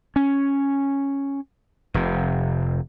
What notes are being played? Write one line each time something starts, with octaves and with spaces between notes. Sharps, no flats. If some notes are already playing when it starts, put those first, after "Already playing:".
C#4
F1 C3